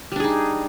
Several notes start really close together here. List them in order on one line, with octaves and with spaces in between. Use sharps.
G3 D4 G#4 D#4